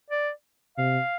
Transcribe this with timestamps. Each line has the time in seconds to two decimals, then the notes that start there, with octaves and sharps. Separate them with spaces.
0.10 D5
0.77 C3 F5